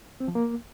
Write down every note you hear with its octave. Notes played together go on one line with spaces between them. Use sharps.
C4
F3
A#3